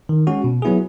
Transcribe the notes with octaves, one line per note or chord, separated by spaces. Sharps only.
D#3
G#3 C#4 F#4
B2
F#3 B3 E4 G#4